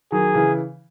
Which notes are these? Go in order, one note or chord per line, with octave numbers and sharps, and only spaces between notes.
D#3 F#3 G#4
C#3 E3